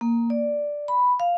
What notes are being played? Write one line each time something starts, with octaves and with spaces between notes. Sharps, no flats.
A#3
D5
B5
F5